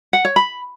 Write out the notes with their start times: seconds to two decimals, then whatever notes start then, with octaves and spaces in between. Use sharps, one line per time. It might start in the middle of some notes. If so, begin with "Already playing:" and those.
0.13 F#5
0.25 C#5
0.36 B5